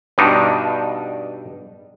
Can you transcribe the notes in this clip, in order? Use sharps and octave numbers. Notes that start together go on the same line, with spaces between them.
G2 B2 D4 D#4